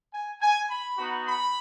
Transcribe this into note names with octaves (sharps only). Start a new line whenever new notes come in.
G#5
G#5
B5
B3 D#4 F#4
B5